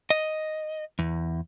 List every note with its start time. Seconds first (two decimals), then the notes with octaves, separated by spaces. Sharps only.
0.10 D#5
0.99 E2